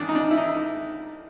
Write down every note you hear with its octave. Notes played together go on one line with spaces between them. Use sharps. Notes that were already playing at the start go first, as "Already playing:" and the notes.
Already playing: C#2 D#3 D4
D#4
D4
E4
D#4